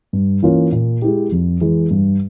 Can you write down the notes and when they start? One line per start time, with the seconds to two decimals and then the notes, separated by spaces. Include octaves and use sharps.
0.13 G2
0.42 E3 A#3 C#4 F4
0.72 A#2
1.02 G#3 E4 G4
1.32 F2
1.61 E3 G#3
1.91 G2